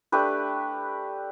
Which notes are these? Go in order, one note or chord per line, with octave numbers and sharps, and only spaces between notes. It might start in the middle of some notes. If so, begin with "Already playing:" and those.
A3 D4 G4 B4